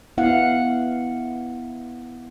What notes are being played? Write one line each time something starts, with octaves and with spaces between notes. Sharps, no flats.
B3 E4 F5 F#5